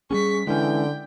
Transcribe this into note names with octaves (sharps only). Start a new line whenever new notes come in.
G3 B3 C#4 G#4 C#6 B6
D3 E3 G#3 C#4 G5